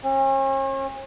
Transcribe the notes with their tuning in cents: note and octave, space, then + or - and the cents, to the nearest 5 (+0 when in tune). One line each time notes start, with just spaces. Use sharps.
C#4 -40